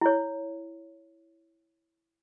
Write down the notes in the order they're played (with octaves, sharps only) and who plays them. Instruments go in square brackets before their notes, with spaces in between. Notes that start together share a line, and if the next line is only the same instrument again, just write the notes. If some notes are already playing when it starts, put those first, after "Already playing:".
[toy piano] E4 C#5